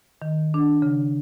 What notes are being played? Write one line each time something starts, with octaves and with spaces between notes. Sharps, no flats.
D#3
D4
C#3